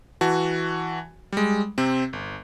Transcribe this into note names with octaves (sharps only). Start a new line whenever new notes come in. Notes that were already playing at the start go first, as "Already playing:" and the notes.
E3 F#4 A5
G3 G#3
C3 C4
G1